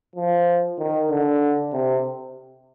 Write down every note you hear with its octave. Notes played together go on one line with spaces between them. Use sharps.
F3
D#3
D3
C3